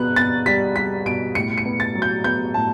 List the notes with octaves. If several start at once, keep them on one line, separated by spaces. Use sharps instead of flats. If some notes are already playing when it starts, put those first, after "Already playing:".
Already playing: B2 B3 F#6
B3 A6
G3 B6
G3 B6
B2 D7
A2 C#7
C#7
B3
A6
F#3
G6
B3 G6
A2 A5